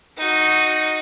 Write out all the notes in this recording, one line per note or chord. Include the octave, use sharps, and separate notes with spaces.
D#4 F#4